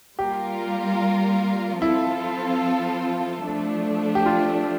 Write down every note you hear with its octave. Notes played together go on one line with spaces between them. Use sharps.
G3 A#3 F4 G4 A#4
F3 C4 E4 F4 A4
F3 A3 D4
G4
F4